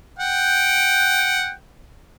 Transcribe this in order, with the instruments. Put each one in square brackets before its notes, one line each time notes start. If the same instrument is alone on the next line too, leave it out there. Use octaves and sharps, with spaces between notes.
[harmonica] F#5 G5